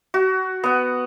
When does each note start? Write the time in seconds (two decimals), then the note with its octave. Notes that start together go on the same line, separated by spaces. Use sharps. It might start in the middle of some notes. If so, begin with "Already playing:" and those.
0.14 F#4
0.63 B3 F#5